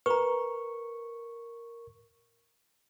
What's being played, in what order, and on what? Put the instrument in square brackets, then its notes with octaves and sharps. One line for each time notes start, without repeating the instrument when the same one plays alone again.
[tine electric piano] A#4 C#6 [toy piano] B4 A#5